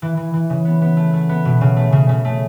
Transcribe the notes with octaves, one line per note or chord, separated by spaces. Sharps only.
E3
E3
E3
C#3
B3
B3
A3
A3
B3
B2
C#3
A3
C#3
C#3
A3